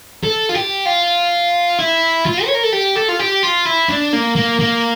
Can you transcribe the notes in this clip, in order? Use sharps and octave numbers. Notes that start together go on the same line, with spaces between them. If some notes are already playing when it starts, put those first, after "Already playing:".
A4
F4
G4
F4
E4
F4
C#5
A#4
A4
G4
A4
F4
G4
F4
E4
D4
A#3
A#3
A#3